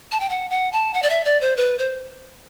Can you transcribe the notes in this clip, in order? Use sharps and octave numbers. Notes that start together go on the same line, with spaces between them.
A5
G5
F#5
F#5
A5
F#5
D5
E5
D5
C5
B4
C5